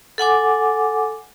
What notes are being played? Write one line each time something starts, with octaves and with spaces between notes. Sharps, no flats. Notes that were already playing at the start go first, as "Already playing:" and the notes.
A4 F#5 G#5 D6